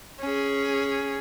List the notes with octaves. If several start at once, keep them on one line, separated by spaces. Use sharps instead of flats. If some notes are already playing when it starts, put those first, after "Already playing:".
C#4 G#4